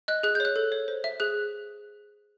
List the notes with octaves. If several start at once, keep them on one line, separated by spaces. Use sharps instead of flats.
D#5 F#6
G#4 F#6
G6
C#5 F#6
A4
C#5
C5
E5
G#4 F#6